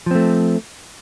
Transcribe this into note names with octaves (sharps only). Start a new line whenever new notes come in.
F3 A3 C4